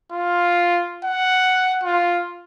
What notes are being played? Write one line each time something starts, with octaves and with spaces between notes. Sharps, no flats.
F4
F#5
F4